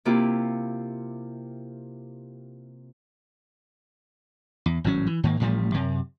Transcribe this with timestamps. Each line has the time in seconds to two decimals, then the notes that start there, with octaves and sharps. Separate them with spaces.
0.05 C3 A#3 E4 F4 G4
4.66 E2
4.84 G#1 A2 F#3 C#4
5.07 E3
5.23 G#2 D#3 A#3
5.40 A1 A2 F3 G3
5.74 F#2 C3